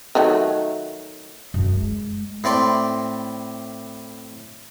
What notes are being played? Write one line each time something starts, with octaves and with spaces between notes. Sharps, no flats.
D#3 F#3 A3
F#2
G#3
A2 C4 D5 C6